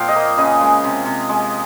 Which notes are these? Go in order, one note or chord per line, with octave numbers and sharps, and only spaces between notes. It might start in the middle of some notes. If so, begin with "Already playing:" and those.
Already playing: A#2 F3 C4 F5 G5
D#5
A#3
C#3 D#5
G#3
C3
C3
G#3